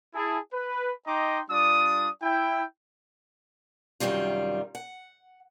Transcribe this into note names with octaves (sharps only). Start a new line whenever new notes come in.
E4 G#4 A5
B4
D#4 D#5 G5 A#5 C6 D6
G3 D4 F4 D5 D#6
E4 G5
F#2 C3 D#3 G3 F4
F#5